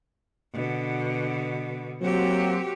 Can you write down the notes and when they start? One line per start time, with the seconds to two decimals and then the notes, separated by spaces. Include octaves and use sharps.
0.53 B2 D3
2.02 F#3 A#3 C4 F#4 G4